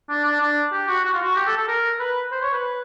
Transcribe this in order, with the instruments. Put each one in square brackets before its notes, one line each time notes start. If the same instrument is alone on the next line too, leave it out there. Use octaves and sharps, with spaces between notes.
[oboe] D4
D4
D4
G4
F#4
F#4
F4
F#4
G4
A4
A4
A#4
B4
C5
C#5
B4